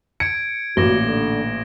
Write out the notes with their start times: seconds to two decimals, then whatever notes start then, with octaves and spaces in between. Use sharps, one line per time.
0.20 G#6 C#7 D7
0.77 A1 A#2 F#4 D6 A#6 G7
1.08 D3